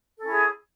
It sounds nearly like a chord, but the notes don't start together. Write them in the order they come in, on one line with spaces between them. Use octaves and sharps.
A4 C#4 E4 G#4